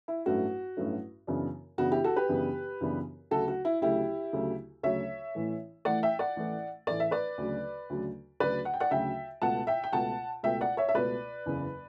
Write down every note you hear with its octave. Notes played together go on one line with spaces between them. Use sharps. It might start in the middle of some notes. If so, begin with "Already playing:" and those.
E4
A1 G2 F#3 A3 C#4 F#4
A1 G2 F#3 A3 C#4
F#2 C#3 E3 B3 D4
F#2 C#3 E3 B3 D4 F#4
E4 G4
F#4 A4
G4 B4
F#2 C#3 E3 B3 D4
F#2 C#3 E3 B3 D4
D2 C#3 F#3 A3 F#4 A4
F#4
E4
D2 C#3 F#3 A3 E4 G4
D2 C#3 F#3 A3
D2 C#3 F#3 A3 C#5 E5
A1 A2 E3 A3
A1 A2 E3 A3 D5 F#5
E5 G5
D5 F#5
A1 A2 E3 A3
A1 A2 E3 A3 D5
E5
B4 D5
D2 C#3 F#3
D2 C#3 F#3
D2 C#3 F#3 B4 D5
F#5
G5
D5 F#5
D2 C#3 F#3 E5 G5
C#2 B2 A3 F#5 A5
E5 G5
G5
C#2 B2 A3 F#5 A5
C#2 B2 A3 E5 G5
D5 F#5
C#5 E5
E5
C#2 B2 A3 B4 D5
F#1 E2 C#3